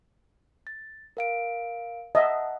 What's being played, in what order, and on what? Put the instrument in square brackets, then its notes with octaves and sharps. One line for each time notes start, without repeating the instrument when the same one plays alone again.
[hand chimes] A6
A#4 F5 D7
[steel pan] D#5 E5 [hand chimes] F#5 A5